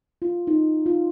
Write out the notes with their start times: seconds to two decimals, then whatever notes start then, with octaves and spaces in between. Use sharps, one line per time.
0.22 F4
0.47 D#4
0.86 F4